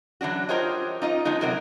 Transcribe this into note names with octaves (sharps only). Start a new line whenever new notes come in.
E3 F#3 D4 F#4
F4 G4 A#4 C5 C#5 D#5
D#4 F4 D#5
F3 G#3 B3 D#4
A2 C3 F#3 A#4